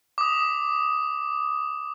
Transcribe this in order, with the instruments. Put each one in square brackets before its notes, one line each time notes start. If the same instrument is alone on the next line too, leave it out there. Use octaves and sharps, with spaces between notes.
[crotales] D6 D#6